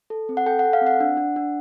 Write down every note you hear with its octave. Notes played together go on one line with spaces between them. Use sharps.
A4
C4
F#5
A4 G5
F#5
A4
F5
C4
F#5
D4
D4
D4